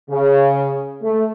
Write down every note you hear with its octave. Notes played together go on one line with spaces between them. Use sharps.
C#3
A3